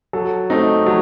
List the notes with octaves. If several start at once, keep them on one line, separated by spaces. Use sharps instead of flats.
F#3 A4
A3 C4 D#4
F#3